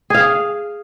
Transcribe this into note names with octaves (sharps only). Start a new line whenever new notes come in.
G#4 F5